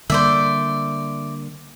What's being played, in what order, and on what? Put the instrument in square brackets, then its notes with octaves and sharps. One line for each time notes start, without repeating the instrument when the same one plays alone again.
[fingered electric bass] D3 G3 A#3 [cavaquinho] C5 D5 E5